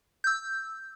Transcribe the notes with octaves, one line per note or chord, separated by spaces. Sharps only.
E6 G6